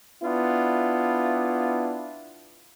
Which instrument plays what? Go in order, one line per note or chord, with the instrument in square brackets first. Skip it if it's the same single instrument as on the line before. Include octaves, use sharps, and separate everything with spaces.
[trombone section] B3 D4 E4 F4